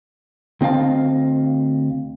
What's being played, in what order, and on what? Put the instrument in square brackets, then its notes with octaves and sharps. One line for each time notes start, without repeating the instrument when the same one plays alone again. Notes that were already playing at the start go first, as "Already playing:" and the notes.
[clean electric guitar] D2 C4 D#5 F5 A5